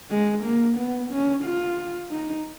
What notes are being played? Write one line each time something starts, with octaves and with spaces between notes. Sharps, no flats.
G#3
A#3
B3
C#4
F4
D#4